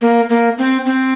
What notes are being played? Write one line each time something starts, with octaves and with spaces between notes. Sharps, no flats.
A#3
A#3
C4
C4